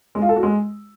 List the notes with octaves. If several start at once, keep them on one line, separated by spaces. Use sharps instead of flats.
G#3
F4
A4
F#4
G#3